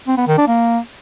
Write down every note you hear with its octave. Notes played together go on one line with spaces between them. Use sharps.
C4
B3
D#3
D4
A#3